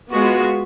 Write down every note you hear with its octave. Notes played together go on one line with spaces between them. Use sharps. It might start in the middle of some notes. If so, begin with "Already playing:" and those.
G#3 B3 F4 F#4